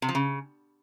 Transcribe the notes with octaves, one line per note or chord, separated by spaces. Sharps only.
C3
F3
C#3